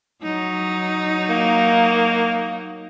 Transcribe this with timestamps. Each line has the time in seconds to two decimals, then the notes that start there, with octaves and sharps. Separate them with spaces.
0.23 F#3 D#4
1.30 A#3